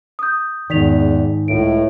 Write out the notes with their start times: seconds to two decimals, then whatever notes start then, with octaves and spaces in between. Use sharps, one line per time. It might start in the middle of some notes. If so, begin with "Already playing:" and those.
0.19 D#6 G6
0.70 E2 G#2 D#3 D5 B6 F7
1.48 C#2 A2 D7